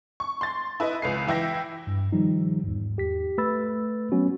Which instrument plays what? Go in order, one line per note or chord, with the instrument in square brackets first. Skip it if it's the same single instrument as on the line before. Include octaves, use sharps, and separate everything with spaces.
[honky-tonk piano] C#6
C6 A6
E4 B4 D#5
C#2 B4 C7
E3 E4 G5 A#6
[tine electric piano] G2
D#3 F3 G3 D#4
E2 G#2
G4 B6
A3 B4 B5 E6 A6
F#3 B3 C#4 F#4